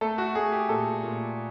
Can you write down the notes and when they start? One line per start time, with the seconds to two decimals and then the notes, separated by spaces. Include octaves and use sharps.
0.01 A3 A4
0.18 F#4
0.35 A3 G#4
0.52 G4
0.69 A#2 A4
1.03 A#2